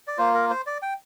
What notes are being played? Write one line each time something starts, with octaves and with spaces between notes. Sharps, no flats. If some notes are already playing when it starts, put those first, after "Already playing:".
D5
A#3 F4 C5
A#4
C5
D5
G5